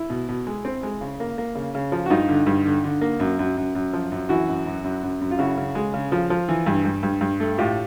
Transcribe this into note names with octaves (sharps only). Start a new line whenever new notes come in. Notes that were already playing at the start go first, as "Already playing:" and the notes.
Already playing: E4
B2
B2
G#3
C4
G#3
C#3
A#3
A#3
C#3
C#3
F3
F#4
G2 D#4 F4
D3
G2
D3
D3
A#3
F#2
F#2
F#2
F#2
F3
F#2
E3 E4 F#4
F#2
F#2
F#2
F#2
F#2
F4
C#3 E4 F#4
C#3
G#3
C#3
F3
F3
E3
G2
G2
G2
G2
A3
A2 F4 G4